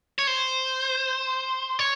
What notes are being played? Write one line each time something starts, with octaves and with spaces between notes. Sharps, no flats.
C#5
C5
C#5